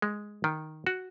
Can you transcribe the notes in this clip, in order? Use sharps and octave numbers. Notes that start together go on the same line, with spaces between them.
G#3
D#3
F#4